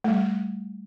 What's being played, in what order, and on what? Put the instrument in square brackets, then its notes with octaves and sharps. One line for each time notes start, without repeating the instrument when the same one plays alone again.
[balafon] G3 A3